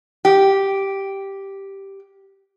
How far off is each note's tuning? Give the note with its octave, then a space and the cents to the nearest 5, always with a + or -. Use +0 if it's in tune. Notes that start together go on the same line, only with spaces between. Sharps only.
G4 -5